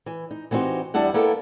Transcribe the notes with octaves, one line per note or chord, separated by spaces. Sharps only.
E3
D#4
E3 B3 C4 D#4 F#4 G4
E2 G3 D4 E4 F#5
A#3 B3 E4 A4 A#4 G5